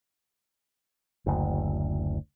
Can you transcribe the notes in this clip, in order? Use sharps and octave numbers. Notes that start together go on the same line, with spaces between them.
F#1 D2